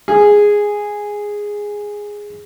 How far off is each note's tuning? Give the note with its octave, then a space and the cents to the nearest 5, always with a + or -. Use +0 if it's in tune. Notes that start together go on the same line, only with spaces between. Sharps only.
G#4 -5